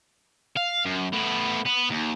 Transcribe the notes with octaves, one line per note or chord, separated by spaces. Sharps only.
F5
F#2
A2 B3
B3
D#2